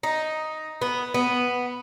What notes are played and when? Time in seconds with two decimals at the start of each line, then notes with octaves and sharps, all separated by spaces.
0.03 D#4
0.82 B3
1.14 B3